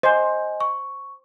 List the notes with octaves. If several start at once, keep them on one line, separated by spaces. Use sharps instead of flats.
C5 D#5 G#5
C#6